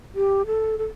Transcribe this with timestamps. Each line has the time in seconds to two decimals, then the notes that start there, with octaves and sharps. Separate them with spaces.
0.15 G4
0.46 A4
0.78 A4